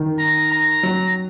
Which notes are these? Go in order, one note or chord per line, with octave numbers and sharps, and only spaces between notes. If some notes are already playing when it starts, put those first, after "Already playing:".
Already playing: D#3
A#5
A#5
F#3